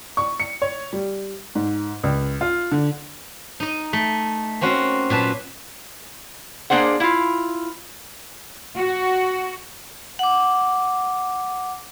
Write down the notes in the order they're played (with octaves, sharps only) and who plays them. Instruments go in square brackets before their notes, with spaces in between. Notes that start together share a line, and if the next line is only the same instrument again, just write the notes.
[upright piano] C#6
C#7
C#5
G3
G#2
C#2
F4
D3
[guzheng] D#4 D#5
A3
A#3 C4 C#4 F#4
A#2 F#3 B4 A5
[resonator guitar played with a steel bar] A#3 D4 G#4 C5 F#5
E4 F4
[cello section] F#4
[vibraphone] F#5 D6